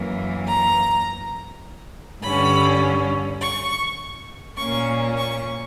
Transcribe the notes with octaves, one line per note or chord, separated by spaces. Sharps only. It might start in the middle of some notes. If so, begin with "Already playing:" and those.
Already playing: F#2 E3 A#3
A#5
G2 D3 G3 C#4 B5
C#6
A#2 A#3 C#4 C#6
C#6